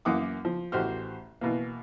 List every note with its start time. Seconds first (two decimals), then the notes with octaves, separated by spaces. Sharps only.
0.05 F#2 E3 A#3 F#5 D6 D#6
0.45 F3
0.72 A1 F#4 G4 C5 F6
1.41 B2 E3 A#3